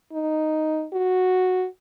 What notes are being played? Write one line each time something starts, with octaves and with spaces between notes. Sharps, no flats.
D#4
F#4